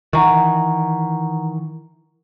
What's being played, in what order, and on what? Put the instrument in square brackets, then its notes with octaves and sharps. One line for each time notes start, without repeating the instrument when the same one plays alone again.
[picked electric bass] D#3 E3 [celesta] F#5 A#5 C#6